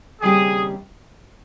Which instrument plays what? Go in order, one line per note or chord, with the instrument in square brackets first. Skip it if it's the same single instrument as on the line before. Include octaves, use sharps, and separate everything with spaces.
[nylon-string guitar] D#2 C#3 G3 C4 G4 [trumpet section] G#4